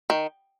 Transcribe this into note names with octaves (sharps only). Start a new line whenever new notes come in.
D#3